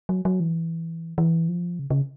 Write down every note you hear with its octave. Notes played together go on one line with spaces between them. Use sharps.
F#3
F#3
E3
E3
F3
C#3
C#3